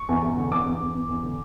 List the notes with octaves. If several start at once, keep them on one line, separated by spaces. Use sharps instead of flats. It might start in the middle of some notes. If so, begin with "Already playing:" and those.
Already playing: C#6
E2
E2
D3
E2 D6
E2
E2
E2
E2
D3